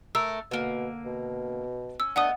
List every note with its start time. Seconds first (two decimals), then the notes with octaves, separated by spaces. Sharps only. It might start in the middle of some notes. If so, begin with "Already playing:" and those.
0.15 A3 A#4 E6
0.51 B2 D3 A#3
1.05 B2
2.00 C#4 E6
2.16 A3 B3 D4 D#5 F#5 D#6